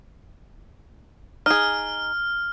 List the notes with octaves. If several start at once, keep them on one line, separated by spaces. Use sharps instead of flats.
D#4 G#4 F6